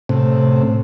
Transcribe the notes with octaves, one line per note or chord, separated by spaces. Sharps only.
A2 C3